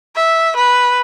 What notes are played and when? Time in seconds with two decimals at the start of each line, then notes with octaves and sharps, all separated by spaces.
0.16 E5
0.56 B4